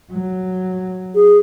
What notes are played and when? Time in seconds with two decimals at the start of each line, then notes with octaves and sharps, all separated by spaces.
0.12 F#3
1.15 G#4